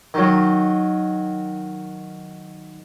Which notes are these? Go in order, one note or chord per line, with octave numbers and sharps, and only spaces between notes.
D#3 F#3